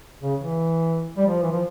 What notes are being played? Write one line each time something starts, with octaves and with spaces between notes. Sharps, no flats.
C#3
E3
G3
F3
E3
F3